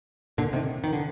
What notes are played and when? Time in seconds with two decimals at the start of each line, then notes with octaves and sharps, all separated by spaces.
0.38 A#2 D3
0.53 C3 D#3
0.84 D#3
0.93 D3